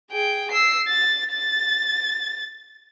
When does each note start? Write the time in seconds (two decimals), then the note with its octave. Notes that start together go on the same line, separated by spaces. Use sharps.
0.11 G#4 G5
0.51 E6 C7
0.87 A6
1.32 A6